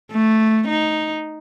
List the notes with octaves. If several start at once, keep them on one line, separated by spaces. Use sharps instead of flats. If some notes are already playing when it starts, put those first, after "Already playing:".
A3
D#4